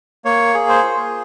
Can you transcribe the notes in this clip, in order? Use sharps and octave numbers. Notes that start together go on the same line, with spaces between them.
A#3 C#5
G#4
C5
F4